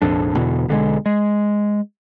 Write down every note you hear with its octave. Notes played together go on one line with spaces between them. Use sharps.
F1 A#1 F2 D4
E2 B2 D3
B1 D3 G3 G#3
G#3